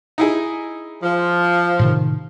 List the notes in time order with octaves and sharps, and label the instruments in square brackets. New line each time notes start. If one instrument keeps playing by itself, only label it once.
[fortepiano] D#4 E4 G#4
[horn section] F3
[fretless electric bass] A2 C3 D#3